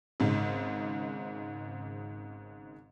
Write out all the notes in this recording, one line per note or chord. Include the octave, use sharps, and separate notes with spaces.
G#1 G#2 C#3